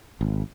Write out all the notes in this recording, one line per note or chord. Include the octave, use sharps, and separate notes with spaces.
G#1